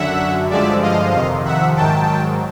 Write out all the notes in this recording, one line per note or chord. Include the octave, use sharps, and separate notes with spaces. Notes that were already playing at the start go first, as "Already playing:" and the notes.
Already playing: F#2 D3 F#3 E5 F#5
G2 D3 F3 G#3 D5 E5
D#5 F5
F2 C3 D#3
E5 F#5
G#2 D#3 F#3 G5 A5